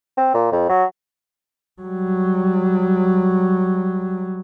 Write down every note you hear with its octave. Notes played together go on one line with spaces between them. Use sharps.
C4
A#2
F2
F#3
F#3 G3